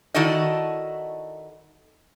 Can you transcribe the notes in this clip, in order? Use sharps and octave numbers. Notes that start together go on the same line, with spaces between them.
D#3 E4 F#4 A4 D5 D#5